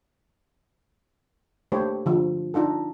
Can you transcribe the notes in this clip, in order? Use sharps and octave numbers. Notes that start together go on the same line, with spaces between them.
A3 A#3 D4 G4 C5 C#5
D3 F3
D4 D#4 F4 A4